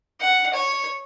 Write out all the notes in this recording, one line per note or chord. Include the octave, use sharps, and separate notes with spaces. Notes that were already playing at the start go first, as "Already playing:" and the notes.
F#5
C#5